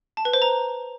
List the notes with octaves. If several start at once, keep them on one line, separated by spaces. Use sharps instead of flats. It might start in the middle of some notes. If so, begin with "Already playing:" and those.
A5
B4
C5
A#5